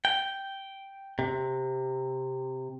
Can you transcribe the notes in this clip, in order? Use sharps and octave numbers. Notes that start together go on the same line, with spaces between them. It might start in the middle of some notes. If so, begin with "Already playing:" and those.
G5
C3